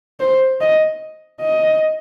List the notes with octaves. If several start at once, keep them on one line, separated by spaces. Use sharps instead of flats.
C5
D#5
D#5